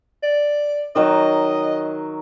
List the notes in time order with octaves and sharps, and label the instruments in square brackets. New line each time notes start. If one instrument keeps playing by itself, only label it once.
[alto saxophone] D5
[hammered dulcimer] D#3 F#3 [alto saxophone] D#5